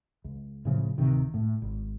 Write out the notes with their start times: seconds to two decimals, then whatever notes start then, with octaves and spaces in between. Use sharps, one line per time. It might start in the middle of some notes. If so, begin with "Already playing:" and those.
0.24 C#2
0.65 A2 C#3 F3
0.98 D1 C3 D#3
1.34 A2
1.62 G#1